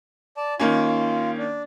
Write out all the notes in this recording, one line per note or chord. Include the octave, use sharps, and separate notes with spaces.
D5 A5
D#3 A#3 C#4 F4
D4